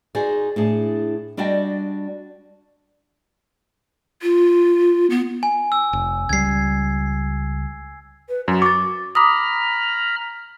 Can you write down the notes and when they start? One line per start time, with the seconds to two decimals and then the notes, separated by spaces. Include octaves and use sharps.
0.15 D#4 F#4 G#4 C5 D5
0.56 A2 D4 G#4
1.37 G3 D4 F#4 D5 D#5 G5
4.22 F4
5.10 B3
5.43 G#5
5.72 E6
5.93 F1
6.29 C#2 G3 G#6 C7
8.29 B4
8.48 F#2 F#4
8.62 C#6 D6 A6
9.15 A#5 B5 D6 D#6 F6